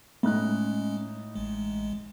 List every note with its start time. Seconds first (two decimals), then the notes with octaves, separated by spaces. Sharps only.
0.23 A2 G#3 C#4 D#4 F#6
1.35 A1 G#3